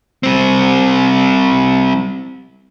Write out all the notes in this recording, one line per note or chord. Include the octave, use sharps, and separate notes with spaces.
G3 C4